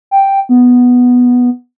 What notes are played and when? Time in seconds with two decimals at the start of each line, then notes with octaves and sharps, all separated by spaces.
0.11 G5
0.49 B3